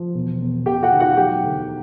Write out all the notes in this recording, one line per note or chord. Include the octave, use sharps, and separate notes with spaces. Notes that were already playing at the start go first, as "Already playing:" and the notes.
Already playing: F3
E1
E1
E1 G4 G5
F#4 F#5
D#3
F#4 F#5
F#3 G4 G5
D2